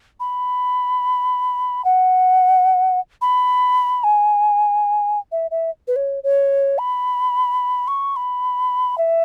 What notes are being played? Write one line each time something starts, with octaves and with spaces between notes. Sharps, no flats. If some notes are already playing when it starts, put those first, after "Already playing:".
B5
F#5
B5
G#5
E5
E5
B4
C#5
C#5
B5
C#6
B5
E5